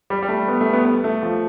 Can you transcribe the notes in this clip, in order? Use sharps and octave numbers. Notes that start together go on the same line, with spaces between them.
G3
G3
A3
B3
A3
B3
B3
A3
F3